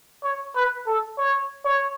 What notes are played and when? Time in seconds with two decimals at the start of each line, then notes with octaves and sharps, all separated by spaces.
0.24 C#5
0.56 B4
0.87 A4
1.18 C#5
1.65 C#5